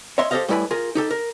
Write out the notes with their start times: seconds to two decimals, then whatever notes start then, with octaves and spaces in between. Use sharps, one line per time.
0.18 C#5 D#5 E5 C6
0.31 G4 A4 A#4 C5 D#5 F5
0.48 A2 G3 E4 B4 G#5 B5
0.71 F4 G#4 A#4
0.95 D#4 G4 A4
1.11 A#4